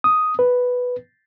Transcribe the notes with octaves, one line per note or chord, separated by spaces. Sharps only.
D#6
B4